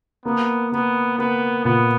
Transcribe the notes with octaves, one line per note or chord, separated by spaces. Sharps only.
A#3 B3
A#3 B3
A#3 B3
A#2 B3